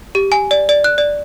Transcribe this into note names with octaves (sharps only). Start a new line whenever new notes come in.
G4
G#5
D5
D5
F#6
D5